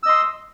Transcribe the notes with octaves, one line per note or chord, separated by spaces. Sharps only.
D#5 C6 E6